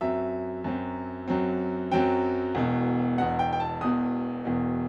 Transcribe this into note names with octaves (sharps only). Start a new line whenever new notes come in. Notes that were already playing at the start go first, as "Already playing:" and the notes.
F#2 F#3 C4 E5
F#2 F#3 C4
F#2 F#3 C4
F#2 F#3 C4 G5
E1 E2 B2
E1 E2 B2 F#5
G5
G5
A5
E1 E2 B2 D#6
E1 E2 B2